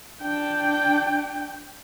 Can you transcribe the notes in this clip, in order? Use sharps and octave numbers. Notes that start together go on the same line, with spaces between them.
D4 G5